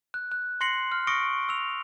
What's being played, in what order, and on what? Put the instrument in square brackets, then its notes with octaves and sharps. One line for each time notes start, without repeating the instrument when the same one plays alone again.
[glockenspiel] F#6
F#6
C6 A#6 C7 C#7 F#7
F6
C#6 D#6 A#6 C#7 D7 G7
E6 F7